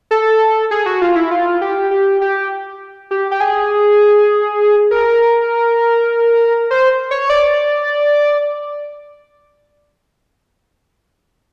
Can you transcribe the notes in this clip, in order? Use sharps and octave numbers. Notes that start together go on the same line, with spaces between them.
A4
G#4
F#4
F4
E4
F4
G4
G4
G4
G4
G4
G#4
A#4
C5
C#5
D5